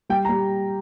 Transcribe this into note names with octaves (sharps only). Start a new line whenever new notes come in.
G3 G5
A#5
G3